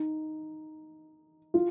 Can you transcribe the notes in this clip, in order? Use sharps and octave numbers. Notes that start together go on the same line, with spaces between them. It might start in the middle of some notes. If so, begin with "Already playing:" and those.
Already playing: D#4
F4